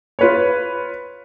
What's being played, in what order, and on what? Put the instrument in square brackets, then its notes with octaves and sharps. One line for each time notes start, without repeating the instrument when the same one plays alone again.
[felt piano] F4 B4 C#5